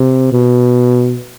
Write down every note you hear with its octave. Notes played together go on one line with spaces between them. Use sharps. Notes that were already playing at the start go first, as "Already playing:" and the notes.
Already playing: C3
B2